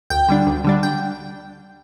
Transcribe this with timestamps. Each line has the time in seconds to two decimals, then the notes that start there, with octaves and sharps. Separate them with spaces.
0.10 D2 G5
0.29 D3 G3 D4
0.47 D2
0.64 D3 G3 D4
0.83 G5